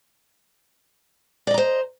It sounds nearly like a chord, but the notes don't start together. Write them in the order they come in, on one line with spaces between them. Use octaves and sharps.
D5 D#5 A#5 C5